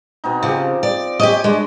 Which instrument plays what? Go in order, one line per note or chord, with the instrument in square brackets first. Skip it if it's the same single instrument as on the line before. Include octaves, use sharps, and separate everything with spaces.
[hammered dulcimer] B2 C4 D#4
[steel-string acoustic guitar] C#3 [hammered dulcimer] F3 G4
[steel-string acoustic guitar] D5
[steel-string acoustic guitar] G4 D#5 [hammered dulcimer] C#5 G#5
[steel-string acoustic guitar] G#3 [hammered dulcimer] D4 C6